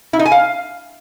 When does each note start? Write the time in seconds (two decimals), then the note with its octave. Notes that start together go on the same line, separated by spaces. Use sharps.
0.13 E4
0.19 D#4
0.25 G#5
0.32 F5